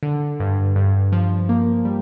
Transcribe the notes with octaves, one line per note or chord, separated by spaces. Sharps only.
D3
G2
G2
F3
A#3
G3